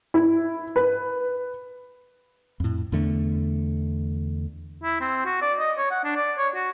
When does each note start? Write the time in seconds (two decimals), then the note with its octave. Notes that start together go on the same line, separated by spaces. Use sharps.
0.14 E4
0.76 B4
2.60 F2 A2
2.92 E2 D3 A3
4.84 E4
5.00 C4
5.26 F#4
5.42 D5
5.59 D#5
5.78 C#5
5.91 F#5
6.04 D4
6.16 D5
6.38 C#5
6.55 F#4